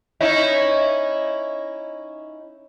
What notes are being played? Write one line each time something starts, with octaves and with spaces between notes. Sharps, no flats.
C#4 D#4 E4